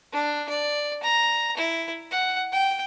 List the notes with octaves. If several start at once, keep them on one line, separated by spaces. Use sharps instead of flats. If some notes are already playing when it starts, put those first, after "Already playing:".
D4
D5
A#5
E4
F#5
G5